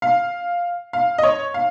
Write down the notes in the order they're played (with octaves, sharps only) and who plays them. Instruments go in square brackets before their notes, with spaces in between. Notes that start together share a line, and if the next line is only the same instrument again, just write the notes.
[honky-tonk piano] F5
F5
D#5
C#5
F5